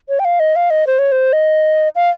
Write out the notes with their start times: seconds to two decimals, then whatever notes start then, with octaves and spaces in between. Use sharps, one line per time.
0.09 C#5
0.19 G5
0.25 F5
0.40 D#5
0.56 F5
0.70 D#5
0.87 C5
0.99 C#5
1.12 C5
1.33 D#5
1.96 F5